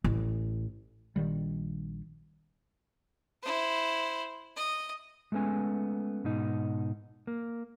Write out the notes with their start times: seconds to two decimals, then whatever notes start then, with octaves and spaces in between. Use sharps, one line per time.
0.04 A1
1.16 A#1 D#3 G3
3.43 E4 C5
4.56 D#5
5.32 G#3 A3 B3 C#4 G#5
6.24 G#2 B2 D#4
7.27 A#3